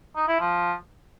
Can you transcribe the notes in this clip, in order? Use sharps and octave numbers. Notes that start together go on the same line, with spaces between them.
D#4
E4
F3